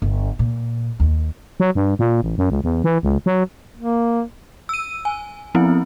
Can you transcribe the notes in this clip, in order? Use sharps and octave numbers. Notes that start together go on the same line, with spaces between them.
G1
A#2
D#2
F#3
G2
A#2
A1
F#2
C#2
E2
E3
C#2
F#3
A#3
E6 D#7
G#5
F3 B3 C4 E4